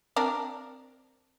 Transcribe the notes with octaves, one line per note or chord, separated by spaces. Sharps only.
C4 D4 A#4